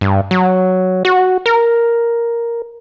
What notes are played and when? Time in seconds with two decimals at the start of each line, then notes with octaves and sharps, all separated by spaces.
0.01 G2
0.31 F#3
1.05 F#4
1.46 A#4